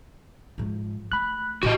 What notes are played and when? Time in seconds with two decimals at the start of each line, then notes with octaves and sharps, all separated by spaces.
0.58 G#2 F3
1.12 A3 B5 F#6
1.63 A2 E3 F#4 G4 D#5